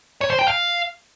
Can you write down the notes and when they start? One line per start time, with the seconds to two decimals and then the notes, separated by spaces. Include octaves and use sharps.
0.21 C#5
0.30 C5
0.39 G5
0.48 F5